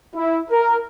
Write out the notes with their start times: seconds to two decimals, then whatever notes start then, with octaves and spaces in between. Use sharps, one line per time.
0.14 E4
0.49 A#4